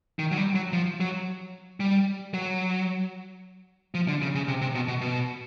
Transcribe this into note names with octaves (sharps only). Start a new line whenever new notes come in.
D#3
F#3
G3
F#3
F3
F#3
G3
F#3
F3
D3
C#3
C#3
C3
C3
B2
B2
B2